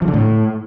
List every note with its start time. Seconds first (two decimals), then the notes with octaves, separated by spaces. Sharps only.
0.02 F3
0.08 D3
0.14 A2